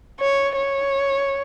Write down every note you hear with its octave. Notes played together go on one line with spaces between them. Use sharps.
C#5
C#5